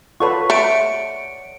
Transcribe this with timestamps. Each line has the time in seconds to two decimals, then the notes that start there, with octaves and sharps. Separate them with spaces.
0.20 F4 A4 B4 C#5 D5 F#5 C#6
0.50 A3 C#7 D7